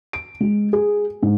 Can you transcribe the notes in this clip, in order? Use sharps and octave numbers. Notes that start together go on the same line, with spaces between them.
D7
G#3
G#4
G#2